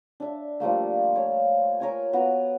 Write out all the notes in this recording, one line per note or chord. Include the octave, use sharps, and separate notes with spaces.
D4 E5
F3 G3 A3 A#3
C#5
A#4 C#5 G#5
B3 F#4 A#5